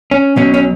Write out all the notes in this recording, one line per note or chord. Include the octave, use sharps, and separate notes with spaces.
C#4
B1 B2 F#3 C#4
C#4